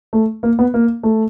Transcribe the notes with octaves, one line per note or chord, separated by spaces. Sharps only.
A3
A#3
B3
A#3
A3